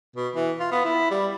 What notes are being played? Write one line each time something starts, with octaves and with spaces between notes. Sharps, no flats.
B2
E3
F4
B3
E4
G3